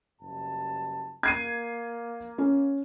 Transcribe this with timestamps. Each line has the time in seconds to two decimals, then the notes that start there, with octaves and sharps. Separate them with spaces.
0.21 F#1 G2 A5
1.23 A#3 G#6 C7 D#7
2.38 C#4